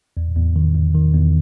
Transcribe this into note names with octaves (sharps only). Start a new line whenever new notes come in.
E2
E2
D#3
E2
D#3
E2